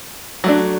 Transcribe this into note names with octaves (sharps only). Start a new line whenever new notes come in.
F#3 A3 D4